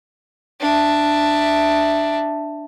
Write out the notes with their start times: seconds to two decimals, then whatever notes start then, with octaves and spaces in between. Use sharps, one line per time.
0.60 D4 E5